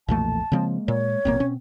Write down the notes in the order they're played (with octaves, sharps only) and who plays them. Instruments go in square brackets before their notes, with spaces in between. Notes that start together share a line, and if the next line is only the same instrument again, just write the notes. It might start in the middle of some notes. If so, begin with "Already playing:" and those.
[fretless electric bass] B1 F2 A3 [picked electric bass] A#2 E3 A#3 [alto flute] A5
[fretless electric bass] C#3 F3 C4 [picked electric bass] G#3 A#3
[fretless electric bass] A#2 [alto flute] C#5
[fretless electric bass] D1 A1 A#3 [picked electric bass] B2 C4
[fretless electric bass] C#4